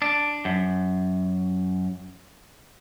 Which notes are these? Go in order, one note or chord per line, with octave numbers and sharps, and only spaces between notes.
D4
F#2